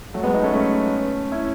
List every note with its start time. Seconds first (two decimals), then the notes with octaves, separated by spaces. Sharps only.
0.14 F#3 A3
0.23 G#3 B3
0.34 B3 D#4
0.43 A3 C#4
0.53 A3 C#4
1.32 C#4 E4